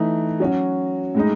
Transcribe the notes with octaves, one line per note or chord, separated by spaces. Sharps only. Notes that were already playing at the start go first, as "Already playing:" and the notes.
Already playing: E3 A3 D#4
F#3 C#4 F#4
A2 G#3 D#4